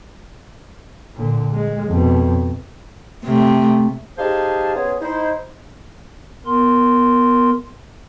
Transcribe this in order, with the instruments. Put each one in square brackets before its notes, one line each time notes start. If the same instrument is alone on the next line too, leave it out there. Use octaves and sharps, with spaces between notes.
[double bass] A#2 D3
G#3
F2 B2
[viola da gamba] C3 A3
[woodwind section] D#4 G4 G#4 C5 F5 A5
B3 C#4 F4 G#4
D#4 E4 C5
[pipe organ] B3 A#4 C6